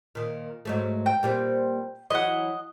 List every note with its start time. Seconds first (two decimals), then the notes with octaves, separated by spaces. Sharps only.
0.15 A#2 D#3
0.65 G#2 F#3 A3
1.06 G5
1.23 A#2 G3 C4
2.10 E3 F#3 D#5 F#5